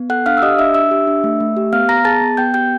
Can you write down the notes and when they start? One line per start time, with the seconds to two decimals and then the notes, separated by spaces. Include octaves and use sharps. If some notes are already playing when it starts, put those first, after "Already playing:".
Already playing: B3
0.10 A4 F#5 F#6
0.26 D4 F5 F6
0.37 E6
0.42 G4 D#5 D#6
0.59 D4 E5 E6
0.75 D4 E5 E6
0.91 G4
1.07 D4
1.24 A3
1.40 A3
1.57 G4
1.73 B3 F5 F6
1.89 B3 A#5 A#6
2.05 G#4 A5 A6
2.22 B3
2.37 B3 G5 G6
2.54 G4 G5 G6